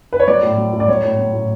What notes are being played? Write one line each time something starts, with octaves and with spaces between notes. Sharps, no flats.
B4
C#5
F#3 D5
A2
F#3
A2
D5
F#3 C#5
A2
F#3
A2